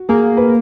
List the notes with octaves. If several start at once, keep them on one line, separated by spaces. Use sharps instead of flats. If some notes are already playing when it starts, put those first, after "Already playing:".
Already playing: F#4
A#3 G#4
B4